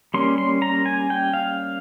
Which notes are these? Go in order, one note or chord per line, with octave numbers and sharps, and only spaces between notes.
G3 A#3 C#4 C6
C6
A#5
G#5
G5
F5